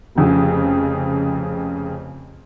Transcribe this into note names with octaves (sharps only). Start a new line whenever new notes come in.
F1 F2 C#3